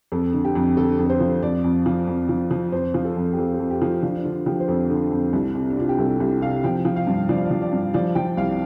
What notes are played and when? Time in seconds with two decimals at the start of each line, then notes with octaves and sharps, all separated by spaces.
0.12 F2 A4
0.33 D3
0.45 G4
0.55 F2
0.77 D3 A4
0.99 F2
1.06 A4
1.10 C5
1.20 F3
1.42 F2 D5
1.64 F2
1.86 F3
2.07 F2
2.29 F3
2.51 F3
2.72 F2 C5
2.94 F3
3.05 A4
3.17 F2
3.33 G4
3.38 F2 A4
3.54 A4
3.59 F2
3.71 G4
3.82 F3
3.87 F4
4.03 F3 D4
4.15 D4
4.25 D3 F4
4.46 F3 G4
4.60 C5
4.68 F2 A4
4.90 D3
5.11 F2
5.33 C2
5.55 C3
5.70 D4
5.77 C3 F4
5.89 G4
5.98 C2 A4
6.20 C2
6.42 C3 F5
6.64 F3 G5
6.85 F3
6.96 F5
7.07 G2
7.29 F3 D5
7.37 F5
7.45 D5
7.51 F3
7.62 D5
7.73 G2
7.94 F3 D5
8.15 F3 G5
8.37 C2 F5